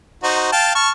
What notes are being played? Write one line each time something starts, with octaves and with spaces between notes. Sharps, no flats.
D#4 F#4 C5
F5 G5 A5
A5 C#6 F6